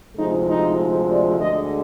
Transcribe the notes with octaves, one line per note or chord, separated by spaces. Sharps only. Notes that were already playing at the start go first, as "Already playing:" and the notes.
D2 C3 F3 G#3 D#4
D#4
D5
D2 D3 G#3 D#5